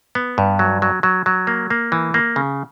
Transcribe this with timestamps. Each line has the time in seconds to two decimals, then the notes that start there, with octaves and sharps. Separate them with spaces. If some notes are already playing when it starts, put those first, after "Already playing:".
0.15 B3
0.38 G2
0.59 F#3
0.82 F#3
1.03 F#3
1.26 F#3
1.47 A#3
1.70 A#3
1.92 E3
2.14 A#3
2.36 C#3